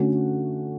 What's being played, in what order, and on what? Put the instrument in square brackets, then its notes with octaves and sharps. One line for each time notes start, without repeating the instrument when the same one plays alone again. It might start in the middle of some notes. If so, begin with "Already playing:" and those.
Already playing: [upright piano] D3 A3 C#4 F#4